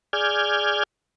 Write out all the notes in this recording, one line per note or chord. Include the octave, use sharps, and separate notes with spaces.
G#4 D5 F6 G6 G#6